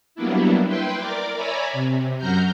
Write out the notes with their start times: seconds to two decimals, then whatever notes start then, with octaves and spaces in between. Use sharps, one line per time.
0.15 F#3 G3 A#3 B3 D4 E4
0.68 E4 B4 G5 C6
0.98 A#4 D5 D6
1.35 C#5 D5 E5 G#5 A#5 B5
1.73 C3
2.18 F#2 F#3 F#4 A#5 F6 G6